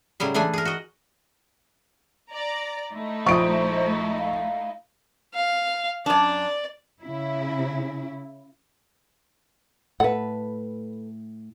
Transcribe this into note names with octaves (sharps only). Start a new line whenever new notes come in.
A2 C#3 F#3 G3 G#4
E3 A3 D4 G#4 G#5
G#4 A#4
F#4 D#5
D5 A#5
A3 D#4 E4
A#1 F3 C5 C#6 D#6 D7
F5
F5
F#2 D4 D5
C#3 E4
A2 A4 B4 F#5